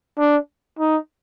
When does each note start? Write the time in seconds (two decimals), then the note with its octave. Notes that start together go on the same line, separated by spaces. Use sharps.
0.19 D4
0.79 D#4